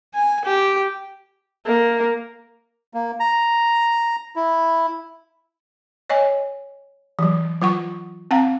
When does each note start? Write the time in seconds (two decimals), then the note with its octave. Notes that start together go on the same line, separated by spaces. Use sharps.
0.14 G#5
0.45 G4
1.66 A#3
2.94 A#3
3.20 A#5
4.36 E4
6.10 C#5 D#5 G#5
7.19 E3 F#3
7.61 F#3 F4 F#5 C#6
8.31 C4 F5 F#5 A#5